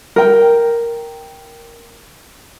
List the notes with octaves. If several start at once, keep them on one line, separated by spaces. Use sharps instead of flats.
A#4 G5